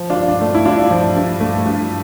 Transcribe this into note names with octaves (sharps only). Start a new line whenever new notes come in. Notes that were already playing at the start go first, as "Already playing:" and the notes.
Already playing: F3
D4 F4
G2
D4
A3
E4
G2 D4 F4
F3
G2
A3
G2